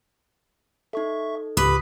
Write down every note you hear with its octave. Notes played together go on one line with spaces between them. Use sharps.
D#4 A4 E5 C#6
C#2 G#2 G4 B4 D6 D#6 B6